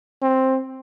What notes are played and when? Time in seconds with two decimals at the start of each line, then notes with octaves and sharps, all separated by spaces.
0.22 C4